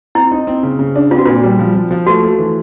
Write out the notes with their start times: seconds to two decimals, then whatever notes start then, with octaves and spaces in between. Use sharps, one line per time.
0.15 C4 E4
0.32 D#4
0.47 C4
0.63 C#3
0.79 C#3
0.96 D4
1.11 C4 F4
1.18 F#4
1.26 A#2 F4
1.43 G3
1.59 F3
1.75 F3
1.91 F3
2.07 A3 F#4
2.23 A3
2.39 E3